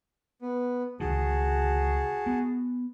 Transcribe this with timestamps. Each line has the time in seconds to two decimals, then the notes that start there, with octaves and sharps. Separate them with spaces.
0.42 B3
1.00 C#2 D3 D#3 F#4 G#4 A5
2.26 B3